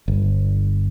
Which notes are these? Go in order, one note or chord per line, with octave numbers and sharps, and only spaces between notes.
G1